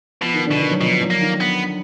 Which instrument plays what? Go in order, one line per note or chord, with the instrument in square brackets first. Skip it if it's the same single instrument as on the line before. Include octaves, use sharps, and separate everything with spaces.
[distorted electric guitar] B2 [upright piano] F3
[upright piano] D#3
[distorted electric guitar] B2 [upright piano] D3
[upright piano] D#3
F#3
[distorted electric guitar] B2 [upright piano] F3
[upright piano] F#3
[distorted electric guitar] A#3
[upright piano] D#3
[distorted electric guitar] B3